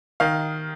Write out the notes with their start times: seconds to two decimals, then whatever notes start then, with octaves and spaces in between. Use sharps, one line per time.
0.20 D#3 F5